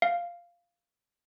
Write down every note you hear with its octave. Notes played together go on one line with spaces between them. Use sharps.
F5